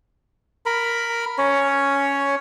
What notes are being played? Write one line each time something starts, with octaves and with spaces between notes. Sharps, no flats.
A#4 B5
C#4 C#5